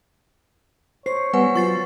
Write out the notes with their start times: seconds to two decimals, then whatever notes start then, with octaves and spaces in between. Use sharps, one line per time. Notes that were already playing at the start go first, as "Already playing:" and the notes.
1.06 C5 C#5 C7
1.33 G3 B3 B4 F#5 G#5
1.55 F#3 F4 C#6 A6 C7